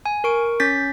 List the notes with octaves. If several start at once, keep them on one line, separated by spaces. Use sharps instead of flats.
G#5
A#4 C#6 D7
C#4 G6 A6 B6